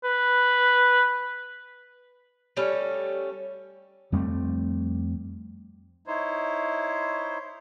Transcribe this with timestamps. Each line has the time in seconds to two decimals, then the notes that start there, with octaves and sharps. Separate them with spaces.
0.04 B4
2.57 G3 A3 C#4
4.12 F2 G3 A3 C4
6.07 D#4 E4 C5 C#5